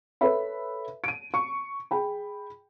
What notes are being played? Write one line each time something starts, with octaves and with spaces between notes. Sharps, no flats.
A4 B4 C#5 E5 B5
D7 D#7
C#6
G#4 G5 B5